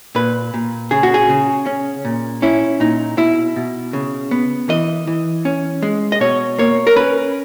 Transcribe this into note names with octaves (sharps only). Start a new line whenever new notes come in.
A#2 B4
A#2
C#3 G#4
F#4
G#4
C#3
C#4
A#2
C#4 E4
A#2 D#4
B2 E4
B2
C#3
B3
E3 D#5
E3
C#4
G#3
D#5
B2 C#5
A#3 C#5
A#4
C#4 B4